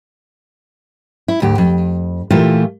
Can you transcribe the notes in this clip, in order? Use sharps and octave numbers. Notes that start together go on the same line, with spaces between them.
E4
D2 G#2 G4
F2
A#2 E3 A3 E4 F4 G4